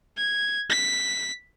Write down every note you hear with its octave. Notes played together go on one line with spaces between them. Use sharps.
G#6
B6